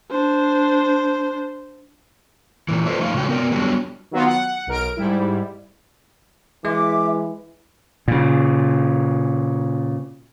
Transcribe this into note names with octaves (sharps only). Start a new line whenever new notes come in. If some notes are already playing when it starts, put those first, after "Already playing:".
D4 C5
A#2 E3
F4 A4 B4 C5 D5 E5
F3 A3 D#4 F5
A2 C#3 G#3 F#4 G5
B3 A#4 D5
F#3 G3 B3 D4
D#3 F#3 B3 F4
F#5
B1 A#4 D7
G#2 G3 E4
E3 G#3 E5 D6
A#2 C#3